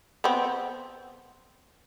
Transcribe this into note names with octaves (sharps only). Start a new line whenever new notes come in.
B3 C4